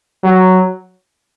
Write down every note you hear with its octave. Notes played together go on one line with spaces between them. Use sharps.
F#3